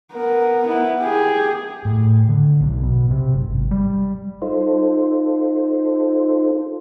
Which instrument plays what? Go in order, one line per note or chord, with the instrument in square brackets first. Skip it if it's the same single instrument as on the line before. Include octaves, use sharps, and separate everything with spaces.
[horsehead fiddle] B3 A#4
B3 E4
G4 G#4
[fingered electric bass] A2
D3
B1
B2
C3
F#1
G#1
G3
[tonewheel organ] D#4 F4 A4 C5